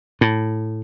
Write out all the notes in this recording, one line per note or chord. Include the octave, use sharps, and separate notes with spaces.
A2